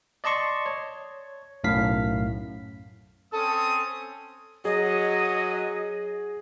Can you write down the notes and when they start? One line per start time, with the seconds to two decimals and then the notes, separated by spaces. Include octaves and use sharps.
0.24 D5 D#5 A5 C6 C#6
0.66 C#5
1.64 B1 F#2 A2 F5 B6
3.33 C4 C#4 A4 D#6
4.65 F#3 G#4 D#5